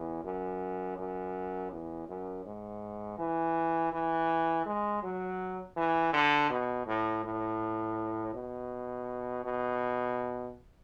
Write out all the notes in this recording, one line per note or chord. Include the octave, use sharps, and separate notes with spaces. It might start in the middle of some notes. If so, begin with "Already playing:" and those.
Already playing: E2
F#2
F#2
E2
F#2
G#2
E3
E3
G#3
F#3
E3
D3
B2
A2
A2
B2
B2